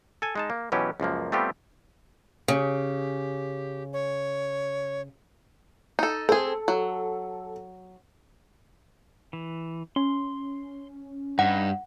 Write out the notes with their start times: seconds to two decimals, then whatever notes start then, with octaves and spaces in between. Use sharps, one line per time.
0.22 A4 G#5
0.36 G#3 D#4 A5
0.50 A#3
0.72 B2 E3 F#3 C#4 G4
1.00 C#2 F#2 F3 A#3
1.32 G3 A3 B3 C4 F4 G4
2.48 C#3 G4
3.93 C#5
5.99 D#4 A4
6.29 C4 G#4 A4
6.68 F#3
9.33 E3
9.96 C#4 C6
11.39 G2 D#4 F#5